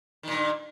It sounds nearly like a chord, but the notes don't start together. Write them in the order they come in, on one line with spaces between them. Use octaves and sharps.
D#3 A#2 G2